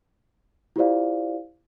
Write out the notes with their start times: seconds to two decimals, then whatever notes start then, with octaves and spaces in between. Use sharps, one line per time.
0.76 E4 F4 G4 C5 D5 F5